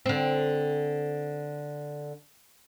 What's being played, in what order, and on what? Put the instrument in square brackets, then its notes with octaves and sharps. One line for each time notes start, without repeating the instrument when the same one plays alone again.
[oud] D3 C4